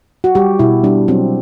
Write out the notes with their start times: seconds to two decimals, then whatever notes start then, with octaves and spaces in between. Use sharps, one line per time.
0.24 F#4
0.35 G3 G4
0.59 B2 E4
0.84 G3 D4
1.08 F#3 C4